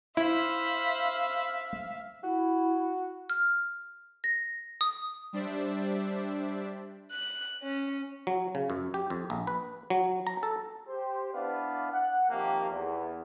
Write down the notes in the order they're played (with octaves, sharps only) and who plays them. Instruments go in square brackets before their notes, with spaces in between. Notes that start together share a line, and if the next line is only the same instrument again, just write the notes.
[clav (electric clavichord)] E4 [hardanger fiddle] C5 B5 [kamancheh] E5 F5
[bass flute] E4 [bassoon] F#4
[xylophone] F6
A#6
D#6
[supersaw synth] G3 D4 C5 D5 E5
[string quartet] F#6
C#4
[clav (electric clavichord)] F#3
C#3
F#2
G4
F2
A#1
B4
F#3
A#5
A4
[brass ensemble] G4 C5
B3 D4 E4 B4 D5 F5
F#5
C3 D#3 F3 A#3 G4
E2